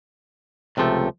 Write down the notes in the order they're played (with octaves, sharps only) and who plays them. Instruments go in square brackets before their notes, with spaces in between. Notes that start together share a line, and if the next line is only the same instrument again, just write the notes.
[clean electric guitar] C#2 C3 F3 A3